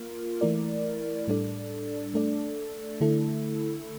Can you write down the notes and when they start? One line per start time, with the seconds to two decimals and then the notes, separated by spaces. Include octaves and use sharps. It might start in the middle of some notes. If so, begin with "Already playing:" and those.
Already playing: A#3 F4 A#4
0.41 E3 A3 E4 A#4 D5
1.28 A2 G3 D4 A4 D5
2.14 A3 D4 A4 D5
3.01 D3 A3 E4 A4